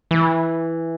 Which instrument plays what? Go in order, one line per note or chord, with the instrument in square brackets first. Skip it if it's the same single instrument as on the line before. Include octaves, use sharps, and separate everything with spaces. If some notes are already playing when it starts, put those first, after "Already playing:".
[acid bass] E3